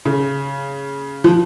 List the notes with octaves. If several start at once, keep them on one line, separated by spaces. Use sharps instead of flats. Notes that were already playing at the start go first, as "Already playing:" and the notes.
C#3
F3